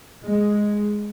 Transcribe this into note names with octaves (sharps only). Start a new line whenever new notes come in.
G#3